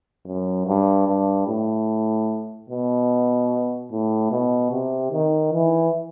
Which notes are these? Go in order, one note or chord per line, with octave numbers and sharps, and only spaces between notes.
F#2
G2
G2
A2
B2
A2
B2
C3
D#3
E3